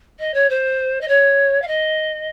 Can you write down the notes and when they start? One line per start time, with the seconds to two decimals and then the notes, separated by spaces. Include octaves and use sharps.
0.19 D#5
0.34 C#5
0.50 C5
1.01 D#5
1.08 C#5
1.62 F5
1.68 D#5